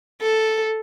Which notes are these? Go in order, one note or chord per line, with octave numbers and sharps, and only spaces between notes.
A4